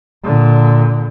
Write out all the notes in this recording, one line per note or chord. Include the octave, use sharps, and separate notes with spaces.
A#2 D3